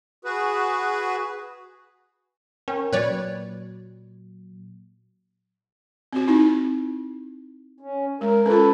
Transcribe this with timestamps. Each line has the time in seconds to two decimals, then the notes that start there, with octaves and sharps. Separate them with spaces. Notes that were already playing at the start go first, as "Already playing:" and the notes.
0.25 F#4 G#4 B4
2.68 C#4 A#4 G5
2.93 A#2 F#3 B4 C#5 D5
6.13 C4 F#4
6.28 C4 D#4 E4
7.80 C#4
8.21 G#3 A#4
8.46 C#4 F4 A4 B4